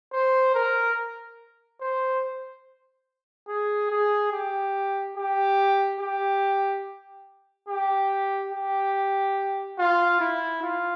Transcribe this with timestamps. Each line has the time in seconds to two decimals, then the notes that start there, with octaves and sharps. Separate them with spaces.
0.13 C5
0.54 A#4
1.80 C5
3.48 G#4
3.91 G#4
4.32 G4
5.17 G4
6.00 G4
7.69 G4
8.52 G4
9.78 F4
10.21 E4
10.62 F4